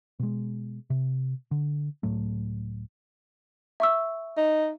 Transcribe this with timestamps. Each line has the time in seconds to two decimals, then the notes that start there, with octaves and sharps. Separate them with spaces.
0.19 B2 G#3
0.90 C3
1.51 D3
2.03 C#2 A2 F#3 A3
3.80 E5 C#6 E6
4.37 D#4